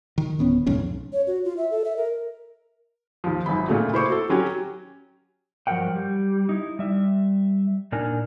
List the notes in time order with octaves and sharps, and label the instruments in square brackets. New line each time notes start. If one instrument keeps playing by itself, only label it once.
[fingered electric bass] D#3
D1 B3 C#4
B1 F2 G#2 C#4
[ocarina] C#5
F#4
F4
E5
A4
E5
A#4
[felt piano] D#2 F3
G#1 F#2 B5
A#2 C#3 A3 F#4
E4 C5 C#6 D6
F#4 A4
F#3 C#4 F#4 G4
[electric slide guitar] G2 F3 F#3 A#4 F#5 G5
G3
D#4 E4
G3 E5
A#2 D4 D#4 A#4 G#5